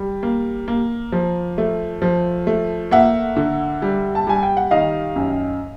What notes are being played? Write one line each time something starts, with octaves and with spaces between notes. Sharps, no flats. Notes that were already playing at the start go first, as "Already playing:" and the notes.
Already playing: G3
A#3
A#3
F3
A3
F3
A3
A#3 E5 F#5
D3
G3
A5
G3 G#5
G5
F#5
D#3 D#5 F5
F#2